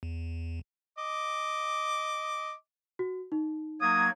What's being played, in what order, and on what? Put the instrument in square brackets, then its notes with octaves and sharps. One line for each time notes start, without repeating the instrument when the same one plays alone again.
[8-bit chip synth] E2
[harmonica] D#5 D6
[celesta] F#4
D#4
[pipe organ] F#3 A#3 [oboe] D#6 [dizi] G#6